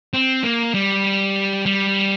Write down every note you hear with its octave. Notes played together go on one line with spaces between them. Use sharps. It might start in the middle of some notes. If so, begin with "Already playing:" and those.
C4
A#3
G3
G3